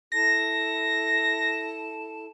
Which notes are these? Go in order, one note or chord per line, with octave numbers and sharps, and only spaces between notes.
E4 A4 A5 A#6